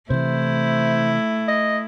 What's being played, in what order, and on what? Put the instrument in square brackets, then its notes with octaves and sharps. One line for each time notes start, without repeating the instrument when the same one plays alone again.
[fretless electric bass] C3 E3 [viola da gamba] A3 E4 [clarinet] C5
[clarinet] D#5